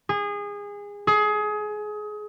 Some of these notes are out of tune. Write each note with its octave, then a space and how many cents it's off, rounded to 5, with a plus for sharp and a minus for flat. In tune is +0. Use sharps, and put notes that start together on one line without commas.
G#4 -25
G#4 +25